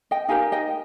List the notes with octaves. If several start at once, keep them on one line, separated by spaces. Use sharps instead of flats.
D#5 G5
D#4 G4 A#4 F5 G#5
D#5 G5